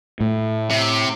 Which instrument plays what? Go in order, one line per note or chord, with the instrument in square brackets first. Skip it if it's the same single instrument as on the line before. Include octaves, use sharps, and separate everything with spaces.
[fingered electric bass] A2
[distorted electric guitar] C3